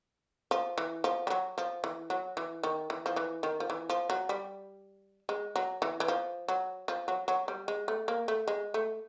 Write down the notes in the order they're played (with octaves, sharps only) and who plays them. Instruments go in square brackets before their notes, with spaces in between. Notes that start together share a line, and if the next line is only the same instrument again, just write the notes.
[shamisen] F3
E3
F3
G3
F#3
F3
E3
F#3
E3
D#3
E3
F3
E3
D#3
F3
E3
F3
F#3
G3
G#3
F#3
E3
E3
F3
F#3
F3
F#3
F#3
G3
G#3
A3
A#3
A3
G#3
A3